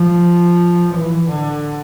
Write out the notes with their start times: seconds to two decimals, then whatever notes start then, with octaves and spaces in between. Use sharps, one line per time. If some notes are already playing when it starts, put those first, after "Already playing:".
Already playing: F3
0.95 E3
1.30 D3